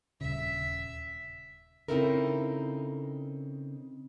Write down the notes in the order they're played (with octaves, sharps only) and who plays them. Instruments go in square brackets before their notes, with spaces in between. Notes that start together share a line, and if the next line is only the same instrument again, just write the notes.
[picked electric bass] D#1 C#3 [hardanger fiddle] E5
[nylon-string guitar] C#3 C4 D#4 E4 A4 A#4